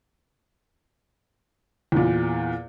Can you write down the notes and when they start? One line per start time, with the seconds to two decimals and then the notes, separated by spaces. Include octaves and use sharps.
1.92 E2 A#2